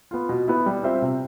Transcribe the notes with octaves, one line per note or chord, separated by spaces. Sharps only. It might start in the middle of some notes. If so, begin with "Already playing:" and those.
B3 F4
B2
B3 E4
G3
C4 F4 C5 E5
C3